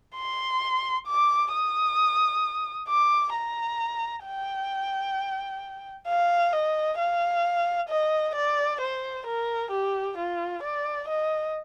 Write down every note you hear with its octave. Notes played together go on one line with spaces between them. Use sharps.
C6
D6
D#6
D6
A#5
G5
F5
D#5
F5
D#5
D5
C5
A#4
G4
F4
D5
D#5